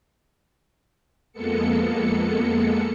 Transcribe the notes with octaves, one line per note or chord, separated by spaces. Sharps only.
F2 G#3 A#3 B3 A4 C#7